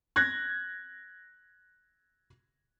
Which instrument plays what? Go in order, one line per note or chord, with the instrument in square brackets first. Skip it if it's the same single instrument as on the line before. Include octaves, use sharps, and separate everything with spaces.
[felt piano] F#6 G#6 A#6